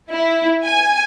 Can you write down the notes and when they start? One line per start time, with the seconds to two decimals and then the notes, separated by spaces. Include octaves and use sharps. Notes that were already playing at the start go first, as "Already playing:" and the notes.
0.10 E4
0.64 G#5